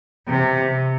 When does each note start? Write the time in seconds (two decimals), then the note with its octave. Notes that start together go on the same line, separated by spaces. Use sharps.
0.28 C3